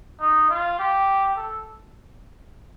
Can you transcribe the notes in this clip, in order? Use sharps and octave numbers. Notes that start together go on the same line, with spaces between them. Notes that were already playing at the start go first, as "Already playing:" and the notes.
D#4
F4
G4
A4